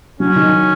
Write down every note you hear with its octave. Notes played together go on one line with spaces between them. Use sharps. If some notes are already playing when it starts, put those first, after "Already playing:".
F#3 C#4
D#3